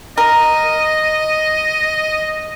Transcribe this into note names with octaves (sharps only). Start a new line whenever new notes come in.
A#4 D#5